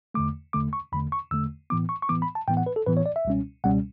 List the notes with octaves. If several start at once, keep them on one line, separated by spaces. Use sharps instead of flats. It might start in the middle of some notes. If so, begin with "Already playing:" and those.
E2 D3 A3 D6
E2 D3 A3 D6
C#6
E2 D3 A3 B5
C#6
E2 D3 A3 E6
A2 E3 B3 D6
C#6
C#6
A2 E3 B3 D6
B5
A5
A2 E3 B3 G5
F#5
B4
A4
A2 E3 B3 B4
C#5
D5
E5
C#2 B2 G3 C#4
C#2 B2 G3 C#4 F#5